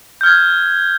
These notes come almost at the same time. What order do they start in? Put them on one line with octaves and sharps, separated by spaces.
G6 F6 G#6